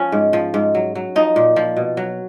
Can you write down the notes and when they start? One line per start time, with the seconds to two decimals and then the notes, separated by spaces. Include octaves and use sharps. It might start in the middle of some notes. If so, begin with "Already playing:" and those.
Already playing: F3 C#4
0.12 G#2
0.33 F3
0.54 G#2
0.75 F#3
0.95 F#3
1.16 F3 D#4
1.36 A#2
1.56 F3
1.76 B2
1.97 F#3